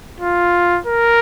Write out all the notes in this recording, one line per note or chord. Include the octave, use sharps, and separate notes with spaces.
F4
A#4